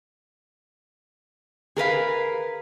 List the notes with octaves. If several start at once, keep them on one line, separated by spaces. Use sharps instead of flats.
G#4 A#4 B4 F5